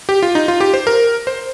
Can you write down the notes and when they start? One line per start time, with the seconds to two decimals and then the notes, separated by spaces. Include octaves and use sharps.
0.09 G4
0.23 F4
0.35 D#4
0.48 F4
0.60 G4
0.74 C5
0.87 A#4
1.27 C5